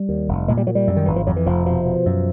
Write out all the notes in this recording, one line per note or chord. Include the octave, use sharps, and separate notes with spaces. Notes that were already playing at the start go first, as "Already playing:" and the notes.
Already playing: G3
D#2
F1
A#2 G#3
G3
A#2 F#3
G3
F#2
D#3
G#1 E3
F3
F2 F#3
E3
F1 F3
B2 F3
B2
F#2